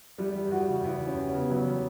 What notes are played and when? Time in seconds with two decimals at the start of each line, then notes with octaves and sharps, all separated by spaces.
0.18 E2 G3
0.35 G3
0.51 E2 F#4
0.68 C#3
0.84 E2 E4
1.01 G3 C#4
1.17 E2
1.28 B3
1.34 C#3
1.50 E2 F#3
1.67 G3